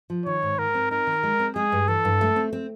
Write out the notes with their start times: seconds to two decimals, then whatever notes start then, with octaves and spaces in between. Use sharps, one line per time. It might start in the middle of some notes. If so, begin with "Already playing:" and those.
0.10 F3
0.26 D#3 C#5
0.43 G#2
0.58 G#2 A#4
0.74 C4
0.91 D#4 A#4
1.07 D#3
1.23 G#3
1.40 C4
1.56 G#3 G#4
1.72 G2
1.88 E3 A4
2.05 G2
2.21 A3
2.36 C4
2.53 C4